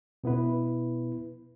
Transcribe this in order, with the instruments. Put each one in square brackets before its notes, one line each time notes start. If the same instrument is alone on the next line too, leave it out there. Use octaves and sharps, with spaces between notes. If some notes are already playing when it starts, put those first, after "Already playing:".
[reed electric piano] B2 B3 E4 B4